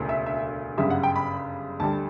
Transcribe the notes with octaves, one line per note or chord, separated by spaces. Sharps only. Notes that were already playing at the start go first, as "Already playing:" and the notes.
Already playing: E1 D2 C#3 E3 A3
E5
E5
G1 F#2 C#3 G3 E5
F#5
G5
B5
D2 D3 G3 A5